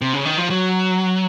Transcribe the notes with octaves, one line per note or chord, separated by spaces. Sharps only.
C3
C#3
D#3
F3
F#3